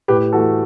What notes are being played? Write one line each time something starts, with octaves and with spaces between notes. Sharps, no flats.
A2 G4 B4
E3 A3 F#4 A4